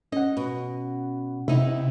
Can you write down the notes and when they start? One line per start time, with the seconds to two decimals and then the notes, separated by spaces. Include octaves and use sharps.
0.12 C#4 D#5 F#5
0.37 B2
1.48 C3 D#4 E4